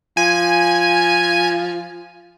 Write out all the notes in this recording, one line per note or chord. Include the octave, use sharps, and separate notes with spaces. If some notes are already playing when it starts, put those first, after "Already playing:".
F3 G#5